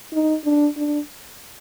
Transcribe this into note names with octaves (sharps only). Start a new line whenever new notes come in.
D#4
D4
D4